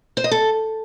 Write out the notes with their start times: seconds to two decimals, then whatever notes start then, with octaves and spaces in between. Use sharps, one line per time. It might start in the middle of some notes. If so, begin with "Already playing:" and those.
0.17 C5
0.24 D#5
0.31 A4